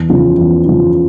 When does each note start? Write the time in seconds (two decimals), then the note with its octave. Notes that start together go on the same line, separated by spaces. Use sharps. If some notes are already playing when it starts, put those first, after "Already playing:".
Already playing: E2
0.09 C#3 F3
0.38 E2
0.65 C#3 F3